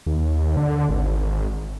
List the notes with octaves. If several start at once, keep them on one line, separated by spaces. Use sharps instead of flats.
D#2
D3
G#1